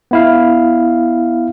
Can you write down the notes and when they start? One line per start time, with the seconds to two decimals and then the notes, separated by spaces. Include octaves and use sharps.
0.11 B3 E4 F5